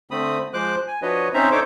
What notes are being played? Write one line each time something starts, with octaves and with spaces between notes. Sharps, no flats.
D3 A3 C4 B5 D#6
F3 G#3 C5 D6 F#6
G#5
F3 D4 F#4 B4 C#5 D#5
C4 C#4 D#4 C5 E5 A#5
D4 D#4 A4 C5 C#5 D6